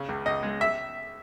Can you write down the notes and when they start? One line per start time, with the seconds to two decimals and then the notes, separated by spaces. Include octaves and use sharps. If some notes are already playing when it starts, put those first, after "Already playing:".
Already playing: C#3
0.09 C#2
0.26 C#2 D#5
0.43 G#3
0.61 E5